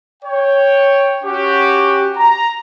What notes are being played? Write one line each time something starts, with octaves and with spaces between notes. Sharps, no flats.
C#5 G5
C#4 F#4 G4
A#5